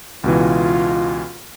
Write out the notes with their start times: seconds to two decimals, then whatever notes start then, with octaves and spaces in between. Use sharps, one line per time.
0.24 C#2 B2 E3 F4